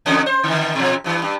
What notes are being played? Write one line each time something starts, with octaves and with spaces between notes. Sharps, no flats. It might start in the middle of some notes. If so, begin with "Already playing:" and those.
E2 D3 C#4
C5
D3 D#3
B2 F3
G2 E3
G2